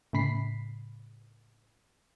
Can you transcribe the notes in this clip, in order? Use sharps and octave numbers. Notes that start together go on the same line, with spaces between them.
A2 C#3 B5 B6 C7